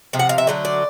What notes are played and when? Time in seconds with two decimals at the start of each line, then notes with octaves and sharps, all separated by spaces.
0.13 C3 F3
0.19 F#5
0.29 F5
0.38 E5
0.47 D3 F#3 A3
0.65 D5